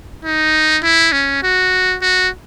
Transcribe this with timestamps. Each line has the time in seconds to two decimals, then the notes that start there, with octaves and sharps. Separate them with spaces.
0.24 D#4
0.83 E4
1.12 C#4
1.43 F#4
2.02 F#4